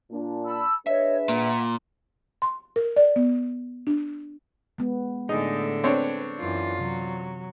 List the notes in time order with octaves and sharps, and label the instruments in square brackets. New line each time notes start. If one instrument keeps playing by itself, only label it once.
[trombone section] A#2 D4
[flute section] A5 B5 E6
[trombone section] D4 G#4 B4 [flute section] C#5 D#5 [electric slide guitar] E5
[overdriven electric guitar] A#2 [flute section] F#5 A#5
[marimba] C6
A#4
D5
B3
D4
[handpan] G#3 B3
[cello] A2 D3 [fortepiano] D#4 [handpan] G#4
[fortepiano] C4 D4 C#5 [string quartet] B4
[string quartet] F#2 E3 [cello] F4
[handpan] C3 E3 [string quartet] F#3